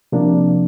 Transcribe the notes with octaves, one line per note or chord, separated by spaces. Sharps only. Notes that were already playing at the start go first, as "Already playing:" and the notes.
C3 F3 A#3 D4